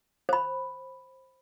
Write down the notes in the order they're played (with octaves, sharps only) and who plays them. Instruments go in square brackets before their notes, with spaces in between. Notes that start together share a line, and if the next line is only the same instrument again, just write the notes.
[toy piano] C5 B5